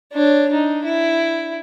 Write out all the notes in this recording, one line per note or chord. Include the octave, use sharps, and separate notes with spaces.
D4 C#5
D4 D#4
E4